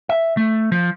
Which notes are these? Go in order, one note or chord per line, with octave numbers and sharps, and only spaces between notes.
E5
A3
F3